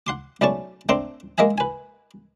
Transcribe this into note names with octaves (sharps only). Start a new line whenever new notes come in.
F#5 C6 D6
B1 A3 C#4 D5 A5 C#6
A3 C4 D4 A#5 C6
G#3 A#3 D#5 E5 G#5
B4 G#5